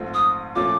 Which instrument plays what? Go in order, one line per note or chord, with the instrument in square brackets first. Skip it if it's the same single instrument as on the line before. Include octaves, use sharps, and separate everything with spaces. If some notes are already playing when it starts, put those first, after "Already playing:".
Already playing: [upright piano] A#1 G#2 F3 A3 C4
[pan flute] D#6
[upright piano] A#2 F3 A3 C#4 [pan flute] D6